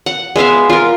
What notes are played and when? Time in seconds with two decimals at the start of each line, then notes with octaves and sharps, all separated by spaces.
0.06 F#5
0.36 G#3 B3 E5 F5
0.70 F4 A#4